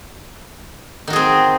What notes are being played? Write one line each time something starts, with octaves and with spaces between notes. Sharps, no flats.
D#3 C4 F#4 G#4